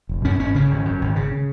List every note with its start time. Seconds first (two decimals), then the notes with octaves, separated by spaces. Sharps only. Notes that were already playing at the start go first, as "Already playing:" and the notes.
0.09 F1
0.25 F#2 C#4
0.40 G#1 C#4
0.54 C#3 C#4
0.71 G#1
0.85 F#2
1.02 G#1
1.16 C#3
1.32 C#3